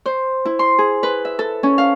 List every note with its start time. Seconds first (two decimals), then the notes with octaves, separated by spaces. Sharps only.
0.06 C5
0.45 E4
0.59 C6
0.79 G#4
1.03 B4
1.25 E5
1.39 A4
1.63 C#4
1.78 F5